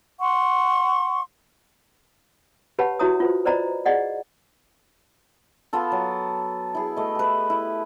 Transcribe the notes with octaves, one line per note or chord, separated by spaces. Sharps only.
F#5 C6 C#6
G4 B4 C#5 F#5 A5 B5
E4 F#4 C#5 E5 A#5 D#6
F4 B4 C5
B4 C5 D5 D#5 A#5 B5
G#4 D5 D#5 F#5
B3 F4 A4
F#3
E4 G#4
A3 D#5
G4 B4
E4